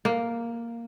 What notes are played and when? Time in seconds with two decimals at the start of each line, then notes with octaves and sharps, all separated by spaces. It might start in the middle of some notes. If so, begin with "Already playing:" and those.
0.05 A#3